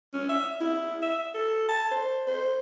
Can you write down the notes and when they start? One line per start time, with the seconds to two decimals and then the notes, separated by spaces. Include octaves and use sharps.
0.13 C#4
0.29 E5
0.60 E4
1.02 E5
1.34 A4
1.68 A5
1.91 C5
2.27 C5